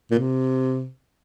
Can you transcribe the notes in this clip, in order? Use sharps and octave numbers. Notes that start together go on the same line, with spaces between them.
A#2
C3